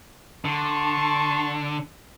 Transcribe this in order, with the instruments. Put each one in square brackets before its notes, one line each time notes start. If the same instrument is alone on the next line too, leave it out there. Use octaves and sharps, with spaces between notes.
[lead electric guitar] D3 [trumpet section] A5 C6 C#6